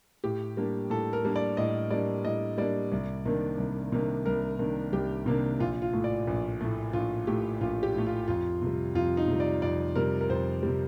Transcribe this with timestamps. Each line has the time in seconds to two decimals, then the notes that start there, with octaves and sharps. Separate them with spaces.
0.24 A2 G4
0.57 G3 A#3 D4
0.90 A2 A4
1.13 A#4
1.25 G3 A#3 D4
1.36 D5
1.57 A2 D#5
1.91 G3 A#3 D4 D5
2.25 A2 D#5
2.58 G3 A#3 D4 D5
2.92 C2
3.25 C3 D#3 A#3 D4
3.58 C2
3.92 C3 D#3 A#3 D4
4.26 C2 A#4
4.59 C3 D#3 A#3 D4
4.92 C2 G4
5.26 C3 D#3 A#3 D4
5.60 A#1 F4
5.82 F4
5.93 A2 A3
6.04 D5
6.27 A#1
6.61 A2 A3
6.93 A#1 F4
7.27 A2 A3 G4
7.61 A#1 F4
7.83 G4
7.94 A2 A3
8.06 F4
8.28 F2 F4
8.62 C3 G3
8.95 F2 F4
9.17 D#4
9.28 C3 G3
9.40 D5
9.62 F2 D5
9.96 C3 G3 A#4
10.21 A#4
10.29 F2 C5
10.63 C3 G3